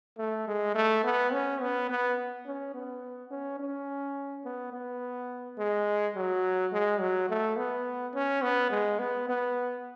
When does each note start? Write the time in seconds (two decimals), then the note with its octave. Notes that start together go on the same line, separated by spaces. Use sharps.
0.18 A3
0.48 G#3
0.75 A3
1.04 B3
1.33 C#4
1.61 B3
1.90 B3
2.46 C#4
2.74 B3
3.31 C#4
3.60 C#4
4.45 B3
4.73 B3
5.58 G#3
6.16 F#3
6.73 G#3
7.00 F#3
7.29 A3
7.57 B3
8.15 C#4
8.42 B3
8.71 G#3
8.99 B3
9.29 B3